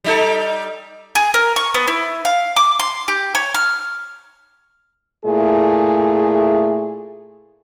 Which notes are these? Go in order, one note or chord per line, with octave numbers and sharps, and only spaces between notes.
G3 D#4 A4
G#4
A#4
C#6
B3
E4
F5
D6
C6
G4
C#5
F6
A#2 A3 E4 G#4